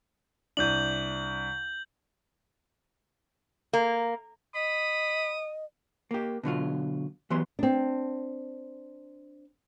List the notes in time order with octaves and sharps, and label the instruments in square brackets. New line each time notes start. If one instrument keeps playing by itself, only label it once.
[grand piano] C2 D4 [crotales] G6 F#7
[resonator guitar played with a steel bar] A#3
[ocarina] D#5 [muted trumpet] B5 [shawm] D#6
[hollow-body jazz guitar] A#3 G4
B2 D3 F#3 F4
E3 F#3 B3 G4 C6
[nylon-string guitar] C4 D4